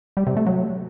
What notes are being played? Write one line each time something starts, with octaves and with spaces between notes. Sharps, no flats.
G3
C3
A3
F#3